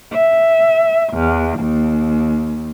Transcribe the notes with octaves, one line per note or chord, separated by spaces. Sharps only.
E5
E2
D#2